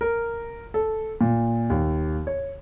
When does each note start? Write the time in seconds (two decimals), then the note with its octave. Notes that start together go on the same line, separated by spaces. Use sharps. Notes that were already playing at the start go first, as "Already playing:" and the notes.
0.01 A#4
0.74 A4
1.21 A#2
1.70 D#2
2.27 C#5